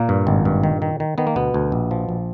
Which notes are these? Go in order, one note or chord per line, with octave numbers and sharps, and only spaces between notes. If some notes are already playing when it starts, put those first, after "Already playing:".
Already playing: A#2 A#3
G2
G#1
G2
D#3
D#3
D#3
D#3 B3
A#3
D2 B2 B3
D2
A#1
F3
A#1